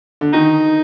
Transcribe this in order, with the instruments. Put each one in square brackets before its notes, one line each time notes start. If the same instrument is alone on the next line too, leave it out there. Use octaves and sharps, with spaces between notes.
[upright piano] D3
[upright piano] D#3 [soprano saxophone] D#4